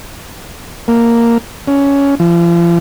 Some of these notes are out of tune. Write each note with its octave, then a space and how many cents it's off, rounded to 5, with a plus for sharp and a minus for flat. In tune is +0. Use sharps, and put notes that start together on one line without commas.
A#3 -5
C#4 +10
F3 -40